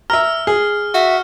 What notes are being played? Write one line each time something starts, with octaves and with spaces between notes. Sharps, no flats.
E5 A#5 F6
G#4
F#4 E5